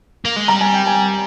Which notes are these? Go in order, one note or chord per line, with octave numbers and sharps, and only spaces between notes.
A#3
G#3
G3 A#5
G#5
G5
G#5